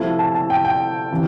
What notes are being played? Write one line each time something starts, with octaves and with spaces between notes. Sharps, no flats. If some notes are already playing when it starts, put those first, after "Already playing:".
Already playing: C3 F3 A3 E4 A5
A5
A5
G5
G5
C3 E3